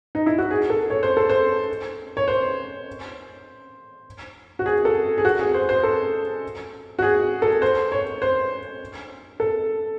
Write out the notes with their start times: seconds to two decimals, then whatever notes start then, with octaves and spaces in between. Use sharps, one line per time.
0.15 D#4
0.26 E4
0.38 F#4
0.51 G#4
0.70 A4
0.90 C#5
1.03 C5
1.17 A4
1.30 C5
2.17 C#5
2.28 C5
4.59 F#4
4.66 G#4
4.85 A4
5.18 G#4
5.25 F#4
5.39 G#4
5.54 C5
5.69 C5
5.83 A4
6.99 F#4
7.02 G#4
7.42 A4
7.62 C5
7.92 C#5
8.22 C5
9.40 A4